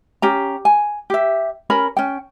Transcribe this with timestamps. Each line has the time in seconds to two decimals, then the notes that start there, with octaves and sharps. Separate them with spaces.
0.22 C#4 G4 A#5
0.65 G#5
1.10 G4 E5
1.70 C#4 A#4 B5
1.97 C#4 G5